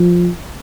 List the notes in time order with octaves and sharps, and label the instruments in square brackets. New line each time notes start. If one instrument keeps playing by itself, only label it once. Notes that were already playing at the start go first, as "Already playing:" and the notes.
Already playing: [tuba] F3